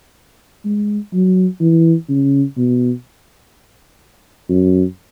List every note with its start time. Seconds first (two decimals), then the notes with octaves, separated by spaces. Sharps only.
0.65 G#3
1.13 F#3
1.60 E3
2.09 C#3
2.57 B2
4.49 F#2